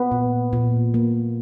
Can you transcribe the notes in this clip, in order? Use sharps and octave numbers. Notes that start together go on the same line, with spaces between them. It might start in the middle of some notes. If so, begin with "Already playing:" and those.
Already playing: B3 B4
A#2
A#2
A#3